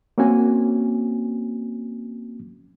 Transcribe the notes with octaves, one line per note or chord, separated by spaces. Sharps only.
A#3 C4 C#4 F#4 G#5